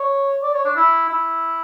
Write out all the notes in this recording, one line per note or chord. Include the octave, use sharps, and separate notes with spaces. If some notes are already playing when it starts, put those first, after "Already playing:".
Already playing: C#5
D5
C#5
D4
E4
E4